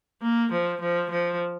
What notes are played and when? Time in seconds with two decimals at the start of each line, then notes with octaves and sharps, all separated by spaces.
0.22 A#3
0.52 F3
0.81 F3
1.10 F3